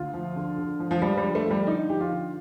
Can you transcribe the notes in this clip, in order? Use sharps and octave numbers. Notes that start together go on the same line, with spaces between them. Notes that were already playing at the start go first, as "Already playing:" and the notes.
Already playing: D2 F4
F3
D3
D3
F3
F3
F3 G3
G3
D3
A3
F3
G3
D3 D#4
F3 G4
F4
D3